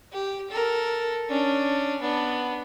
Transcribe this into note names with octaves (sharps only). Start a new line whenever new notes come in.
G4
A4 A#4
C#4 D4
B3 D4